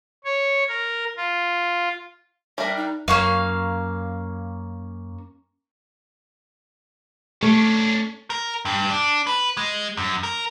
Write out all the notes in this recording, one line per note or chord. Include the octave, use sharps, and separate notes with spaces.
C#5
A#4
F4
G3 D4 A#4 E5
D#4
F#2 A#3 C#4 F5
A3 C#4 D4
A#4
G2
D4
B4
G#3
F#2
A#4